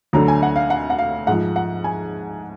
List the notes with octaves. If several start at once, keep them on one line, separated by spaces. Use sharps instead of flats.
D2 D3 F#3 A#5
G#5
F#5
F5
F#5
F#5
F5
G#2 F3 F#5
F#5
G#5